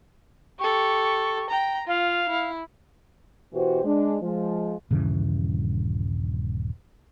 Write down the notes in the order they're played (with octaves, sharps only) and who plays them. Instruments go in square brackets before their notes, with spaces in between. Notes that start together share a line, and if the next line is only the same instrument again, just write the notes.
[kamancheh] G4 A4 [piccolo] C#6
[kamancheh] G5 A#5
[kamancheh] F4 [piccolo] F5
[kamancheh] E4
[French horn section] B2 E3 F#4 G4 C5
G#3 D4
F3 G#3
[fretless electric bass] D#1 G2 C#3 E3